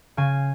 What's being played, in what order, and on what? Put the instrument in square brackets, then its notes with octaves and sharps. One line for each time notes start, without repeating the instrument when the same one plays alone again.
[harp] C#3 G#5